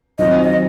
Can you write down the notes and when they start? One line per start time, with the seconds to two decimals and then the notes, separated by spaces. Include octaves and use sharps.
0.19 D#3 F#3 C4 F4 D#5
0.43 D#5